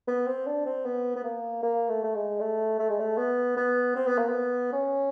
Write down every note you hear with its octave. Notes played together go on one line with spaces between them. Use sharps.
B3
C4
D4
C4
B3
B3
A#3
A#3
A3
A3
G#3
A3
A3
G#3
A3
B3
B3
C4
B3
A#3
B3
C#4